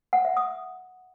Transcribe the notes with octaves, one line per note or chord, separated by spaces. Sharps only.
F#5
E5
D#6